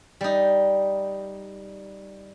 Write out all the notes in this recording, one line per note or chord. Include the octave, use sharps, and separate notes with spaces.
G3 D#4